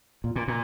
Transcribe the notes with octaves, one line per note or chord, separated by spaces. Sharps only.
A#2
A#2
A#2